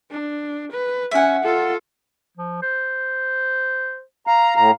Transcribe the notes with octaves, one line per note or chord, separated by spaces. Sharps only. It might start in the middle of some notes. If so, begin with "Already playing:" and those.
D4
B4
C#4 E5 F#5 G#5
F4 A4
F3
C5
F5 A#5
A2 A#5